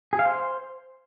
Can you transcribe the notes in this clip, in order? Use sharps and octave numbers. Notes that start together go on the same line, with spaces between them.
G#4
F5
C5